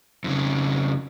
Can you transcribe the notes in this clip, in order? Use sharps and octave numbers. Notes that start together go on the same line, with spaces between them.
F2 C#3